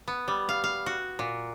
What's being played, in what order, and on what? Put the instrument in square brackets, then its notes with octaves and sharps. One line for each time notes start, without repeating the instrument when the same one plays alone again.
[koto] B3
G3
F5
F5
F#4
A#2